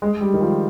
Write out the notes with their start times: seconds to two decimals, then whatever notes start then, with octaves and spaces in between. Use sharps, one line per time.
0.02 G#3
0.21 G3
0.34 D#3
0.41 F3